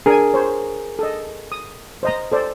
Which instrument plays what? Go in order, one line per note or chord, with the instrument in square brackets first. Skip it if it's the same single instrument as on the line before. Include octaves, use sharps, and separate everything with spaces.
[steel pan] D4 G#5 [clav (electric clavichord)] G#4 A#4
[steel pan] C5 C#5
A4 D#5
D#6
C5 D#5 A#5
A4 C5 D5